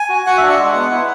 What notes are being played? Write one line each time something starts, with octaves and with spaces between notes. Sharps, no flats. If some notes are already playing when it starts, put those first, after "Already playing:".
Already playing: G#5
F#4
F#4 F#5
D4 E5
F#5
G#3
B3
E4